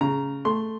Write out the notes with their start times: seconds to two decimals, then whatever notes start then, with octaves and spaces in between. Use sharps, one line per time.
0.01 C#3 A#5
0.45 A3 C6